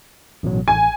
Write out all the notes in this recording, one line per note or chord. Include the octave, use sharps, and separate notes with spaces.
A1 B2 F#3
A1 G#5